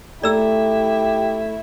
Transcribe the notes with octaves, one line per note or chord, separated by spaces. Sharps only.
A3 E4 G4 D5 A#5 E6